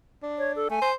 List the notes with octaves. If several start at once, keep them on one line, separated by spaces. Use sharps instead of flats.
D4
C#5
A4
A3 G#5
C5